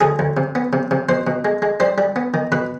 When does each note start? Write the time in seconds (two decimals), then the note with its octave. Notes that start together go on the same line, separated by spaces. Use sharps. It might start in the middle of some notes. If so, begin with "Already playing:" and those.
0.01 D2 G#4
0.19 D2
0.37 C3
0.55 B3
0.73 C3
0.91 C3
1.09 B2 C5
1.27 B2
1.45 G#3
1.62 G#3
1.80 G3 C5
1.98 G3
2.16 B3
2.34 D#3
2.52 B2 B4